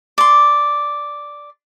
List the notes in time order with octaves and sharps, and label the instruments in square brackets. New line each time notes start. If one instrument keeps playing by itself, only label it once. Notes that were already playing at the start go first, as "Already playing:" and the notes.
[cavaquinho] D5 C6